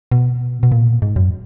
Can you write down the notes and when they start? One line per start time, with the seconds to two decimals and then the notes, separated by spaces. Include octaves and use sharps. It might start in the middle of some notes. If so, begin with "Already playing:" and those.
0.12 B2
0.63 B2
0.72 A#2
1.02 G#2
1.16 F#2